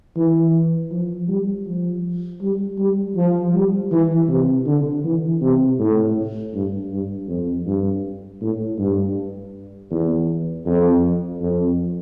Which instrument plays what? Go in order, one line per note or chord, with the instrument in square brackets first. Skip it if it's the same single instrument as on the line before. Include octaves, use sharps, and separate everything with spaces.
[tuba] E3
F3
G3
F3
G3
G3
F3
G3
E3
C3
D3
E3
C3
A2
G2
G2
F2
G2
A2
G2
E2
F2
F2